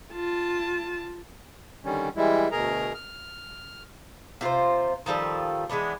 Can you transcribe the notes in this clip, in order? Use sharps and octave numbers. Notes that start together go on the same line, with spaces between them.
F4 A5
D3 D#3 G3 C#4
E3 G3 G#3 E4
D2 B2 G#4 A#4 A#5
F6
C3 F4 F#4 C5
D#3 F3 G3 A4
E3 G#3 B3 D4